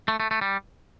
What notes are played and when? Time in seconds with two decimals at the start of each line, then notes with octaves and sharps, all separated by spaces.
0.08 A3
0.20 A3
0.31 A3
0.41 G3